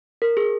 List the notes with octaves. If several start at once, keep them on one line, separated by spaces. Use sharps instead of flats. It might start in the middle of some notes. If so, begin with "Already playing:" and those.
A#4
G#4